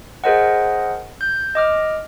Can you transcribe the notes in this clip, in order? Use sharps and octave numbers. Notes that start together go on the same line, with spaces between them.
G#4 A#4 C5 D#5 F#5
G6
D#5 D6 F6